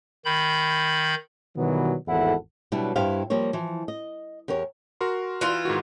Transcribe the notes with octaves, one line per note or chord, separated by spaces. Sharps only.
D#3 B5 G6
B2 D#3 E3 F#3 G3 B3
G#1 E2 A2 E4 A4 F#5
B2 F#3 G3 D4 E4
G2 E4 G4 C5 F5
F3 G3 A#3 C#5
E3 F3
D#5
E2 G4 A#4 C#5
F#4 A#4 C6
E3 F4
G#2 D#3 F#4